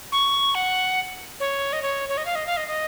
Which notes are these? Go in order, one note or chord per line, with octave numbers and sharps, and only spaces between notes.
C#6
F#5
C#5
D#5
C#5
C#5
D#5
F5
D#5
F5
D#5
D#5